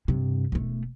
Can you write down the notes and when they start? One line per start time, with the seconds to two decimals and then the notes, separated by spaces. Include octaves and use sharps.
0.08 G2 C3
0.52 E1 A3